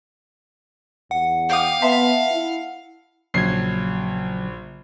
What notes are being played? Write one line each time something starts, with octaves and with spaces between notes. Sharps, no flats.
E2 F#5
F5 G5 D#6
B3 E5 A5 C6
E4
A#1 C#3 F#3 G#6 C7